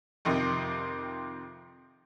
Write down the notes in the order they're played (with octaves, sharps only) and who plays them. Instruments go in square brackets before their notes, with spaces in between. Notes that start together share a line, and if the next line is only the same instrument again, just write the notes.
[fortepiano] F2 C3 D#3